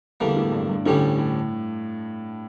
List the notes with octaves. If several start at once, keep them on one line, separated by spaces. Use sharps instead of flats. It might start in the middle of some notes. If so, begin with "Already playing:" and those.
E2 D3 G3 A#3
A2
G2
G2
D2 A2 D3 G3 C#4 G4
A2